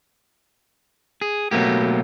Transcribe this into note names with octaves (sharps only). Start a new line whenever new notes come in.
G#4
B2 F#3 A3 A#3 G4